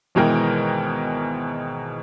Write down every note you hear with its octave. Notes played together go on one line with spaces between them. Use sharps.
G#1 B2 E3 G#3 A#4 G5